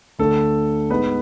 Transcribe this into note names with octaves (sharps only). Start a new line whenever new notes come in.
D2 D3 A3 A4
G#2 G#3 B3 B4